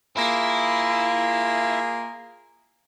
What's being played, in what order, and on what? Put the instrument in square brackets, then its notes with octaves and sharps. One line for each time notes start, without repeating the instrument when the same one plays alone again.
[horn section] A#3 F4 G#4 [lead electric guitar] E4